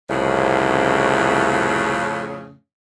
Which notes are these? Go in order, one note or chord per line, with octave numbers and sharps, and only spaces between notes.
C2 F2 A2 C#3